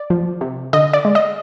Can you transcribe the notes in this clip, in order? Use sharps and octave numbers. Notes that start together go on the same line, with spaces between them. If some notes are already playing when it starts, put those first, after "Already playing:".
Already playing: D5
F3
C3
D3 D#5
D5
G#3
D#5